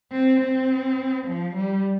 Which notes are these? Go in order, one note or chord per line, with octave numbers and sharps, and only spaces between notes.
C4
C4
F3
G3